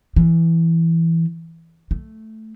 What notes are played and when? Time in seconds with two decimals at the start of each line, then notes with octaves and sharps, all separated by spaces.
0.16 E3
1.91 A3